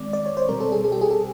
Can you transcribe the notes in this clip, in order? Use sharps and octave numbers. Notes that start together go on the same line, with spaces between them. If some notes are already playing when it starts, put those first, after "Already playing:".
Already playing: D#3 G#3 C4 D5
D5
C#5
C5
B2 G3 C4 A#4
A4
G#4
G#4
G4
G#4
A4